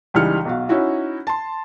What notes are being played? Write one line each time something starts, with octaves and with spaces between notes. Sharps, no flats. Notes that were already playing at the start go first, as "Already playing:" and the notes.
C#2 E3 G3 D#4 F6 C#7
B1 F#4 F5
C#4 D#4 E4 F#4
A5 C6